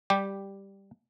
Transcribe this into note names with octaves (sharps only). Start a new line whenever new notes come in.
G3 G4